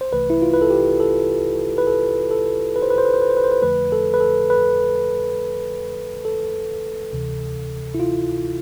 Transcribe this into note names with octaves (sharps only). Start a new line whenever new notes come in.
C5
C2 C3 E3 A3 B4
E4
F4
B4
A4
G4
A4
B4
A4
A4
B4
C5
B4
C5
B4
C5
B4
C5
B4
C5
B4
F2 D3 F3 A3 B4
A4
B4
A4
B4
A4
D2 C3 E3
E4
F4